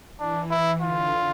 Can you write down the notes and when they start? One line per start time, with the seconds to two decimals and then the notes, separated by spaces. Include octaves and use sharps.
0.19 E3 D4
0.51 E4
0.81 D3 F4